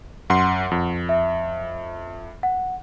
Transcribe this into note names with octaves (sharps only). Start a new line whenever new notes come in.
F#2 F#5 C6
F2
E5
F#5